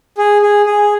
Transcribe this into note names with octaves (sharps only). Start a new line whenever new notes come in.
G#4
G#4
G#4